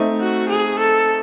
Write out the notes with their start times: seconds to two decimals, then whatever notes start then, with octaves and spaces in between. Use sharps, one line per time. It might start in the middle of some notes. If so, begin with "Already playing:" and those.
Already playing: A3 C4 D#4
0.21 F#4
0.49 G#4
0.79 A4